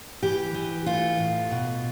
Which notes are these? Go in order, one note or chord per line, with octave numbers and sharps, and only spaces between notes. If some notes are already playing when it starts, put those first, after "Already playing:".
E3 G4
E3
A3 F4
A2
B2